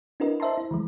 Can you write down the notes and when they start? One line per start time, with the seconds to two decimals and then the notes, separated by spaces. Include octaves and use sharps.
0.20 D4 E4 F#4 A#4 B4 D#5
0.40 C5 D#5 E5 A5 A#5 C6
0.58 E4
0.71 E3 F3 G#3